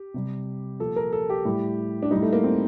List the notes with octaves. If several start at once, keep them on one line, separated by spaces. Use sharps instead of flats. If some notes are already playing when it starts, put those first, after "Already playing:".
Already playing: G4
C3 G3
A#2 F3 A4
A#4
A4
G4
A2 G3
D4
A2 G3 D#4
A3
A#3
C4